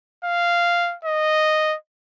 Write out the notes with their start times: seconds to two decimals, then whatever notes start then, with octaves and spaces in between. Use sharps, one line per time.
0.24 F5
1.05 D#5